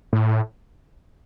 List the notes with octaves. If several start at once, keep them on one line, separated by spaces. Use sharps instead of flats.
A2